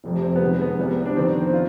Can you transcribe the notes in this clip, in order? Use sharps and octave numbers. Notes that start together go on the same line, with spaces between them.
F1 F2 C3 G3
C4
B3
F2 C3 D#3 G#3
B3
C2 C3 G3 B3
D4
F2 D#3 B3 C4
C4
F4